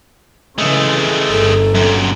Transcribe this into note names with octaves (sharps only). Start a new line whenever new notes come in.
C#3 E3 G#3 A3
G1 A4
F#2 A#2